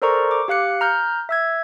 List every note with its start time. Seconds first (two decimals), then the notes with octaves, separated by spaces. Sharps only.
0.02 A4 A#4 C5 D5 A#5 C#6
0.31 D6
0.48 G4 F5 F#6 C#7
0.81 A#5 F6 G6
1.29 E5 E6 G#6